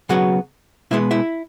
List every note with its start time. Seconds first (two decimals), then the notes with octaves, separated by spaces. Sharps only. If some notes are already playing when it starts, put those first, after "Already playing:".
0.09 C#3 F#3 B3 F#4 F#5
0.91 B2 G#3 B3 E4 E5
1.11 E4 E5